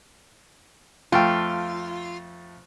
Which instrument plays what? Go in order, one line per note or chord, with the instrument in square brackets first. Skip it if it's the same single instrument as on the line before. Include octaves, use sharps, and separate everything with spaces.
[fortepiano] F2 A3 G5 [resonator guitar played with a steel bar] F4